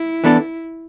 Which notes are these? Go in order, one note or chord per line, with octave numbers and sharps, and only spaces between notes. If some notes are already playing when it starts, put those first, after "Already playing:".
Already playing: E4
E3 B3 D4 A4